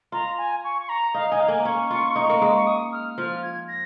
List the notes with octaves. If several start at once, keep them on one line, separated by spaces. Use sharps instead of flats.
F4 A#5
G#5
C#6
C#6
A#5
D#4 F5
D#4 G#5
F5
A#3 G#5
C#4 C#6
F4
D#4
A#3
G#3
C#6
D#6
F6
F3 F6
G#6
A#6